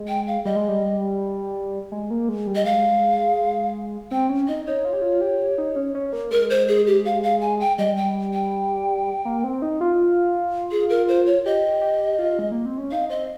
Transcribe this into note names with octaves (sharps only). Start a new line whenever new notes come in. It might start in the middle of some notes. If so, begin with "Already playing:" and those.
Already playing: G#3
G5
F5
G3 D#5
G#3
G3
G#3
A#3
G#3
G3
D#5
G#3 F5
C4 G5
C#4
D#4 D#5
D#4 C#5
F4
G4
F4
G4
D#4
C#4
C#4
A#3
G#3 A#4
C5
G#4
G4
F5
F5
G#5
G5
G3 D#5
G5
G5
A#3
C4
D#4
F4
G#4
A#4
C5
C#5
G4 D#5
G4
F4
G#3
A#3
C4
C#4
D#4 F5
C4 D#5